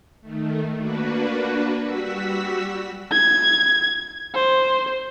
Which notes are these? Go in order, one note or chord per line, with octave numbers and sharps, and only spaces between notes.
D#3 A3
A#3 D4 F#4 B4
G3 F#4 E6 B6
G#6
C5